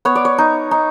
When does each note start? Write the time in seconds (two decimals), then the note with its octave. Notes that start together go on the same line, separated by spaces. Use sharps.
0.05 B3 C#5
0.15 D5
0.25 C#5
0.38 D#4
0.71 D#4